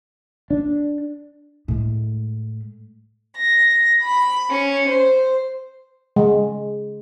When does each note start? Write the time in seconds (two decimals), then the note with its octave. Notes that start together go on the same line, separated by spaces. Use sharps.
0.50 D4
1.68 A2 G#3
3.37 A#6
4.02 B5
4.49 C#4
4.88 C5
6.16 G#3